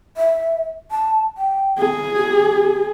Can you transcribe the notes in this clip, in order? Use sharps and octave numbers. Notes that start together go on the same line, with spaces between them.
E5
A5
G5
G#4
G4